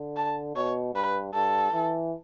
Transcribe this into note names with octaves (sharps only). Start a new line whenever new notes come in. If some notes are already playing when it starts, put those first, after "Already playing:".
Already playing: D3
A5
B2 C#5
G2 B4
G2 A4
E3